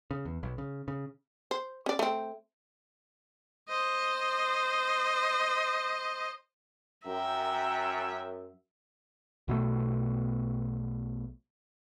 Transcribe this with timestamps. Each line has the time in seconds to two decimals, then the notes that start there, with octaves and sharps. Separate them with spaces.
0.11 C#3
0.25 E2
0.43 B1
0.58 C#3
0.88 C#3
1.51 C5
1.86 C#4 D5
1.99 A3 C4
3.69 C5 D#5
7.07 F#2 E5 G5 A#5
9.48 B1 B2 D3 A3